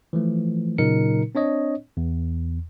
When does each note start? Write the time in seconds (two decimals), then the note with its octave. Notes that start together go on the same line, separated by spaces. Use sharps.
0.13 E3 F3 A3
0.78 A#2 C#3 F#3 D#4 A#4 C#7
1.35 C4 D4 C#5 D#5
1.97 E2